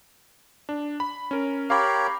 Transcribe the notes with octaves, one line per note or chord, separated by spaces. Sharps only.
D4
B5
C#4 A#4
G4 A#4 C#5 F5 B5